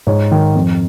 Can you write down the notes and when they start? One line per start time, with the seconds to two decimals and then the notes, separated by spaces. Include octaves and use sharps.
0.07 G#2 C#5
0.32 D#3
0.55 F2